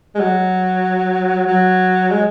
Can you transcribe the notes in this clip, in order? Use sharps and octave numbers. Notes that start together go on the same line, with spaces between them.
G#3
F#3
F#3
G#3